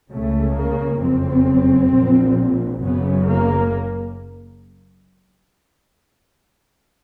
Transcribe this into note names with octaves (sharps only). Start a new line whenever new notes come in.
C#2 C#3 A3
A#3
F#1 F2 C#3 C4
A#1 A#2
F#1 F#2 C#3 B3
A#3